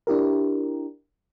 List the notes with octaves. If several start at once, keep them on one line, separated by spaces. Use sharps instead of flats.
D4 E4 G4 A#4